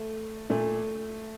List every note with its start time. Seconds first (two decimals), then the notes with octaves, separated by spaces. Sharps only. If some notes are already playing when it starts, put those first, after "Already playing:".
Already playing: A3
0.50 A#2 A3